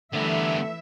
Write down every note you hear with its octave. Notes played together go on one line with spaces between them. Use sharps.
D3 E3 G3 A3 B3 A#4 E5